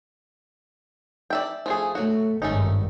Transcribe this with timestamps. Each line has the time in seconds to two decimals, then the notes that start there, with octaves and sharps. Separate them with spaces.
1.30 D5 E5 G5
1.66 F3 A3 G#4
1.95 F#3 A3 F#4
2.42 G#1 G2 A3 C#4 D#4